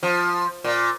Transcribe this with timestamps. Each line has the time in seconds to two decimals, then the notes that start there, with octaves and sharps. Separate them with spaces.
0.03 F3
0.64 A#2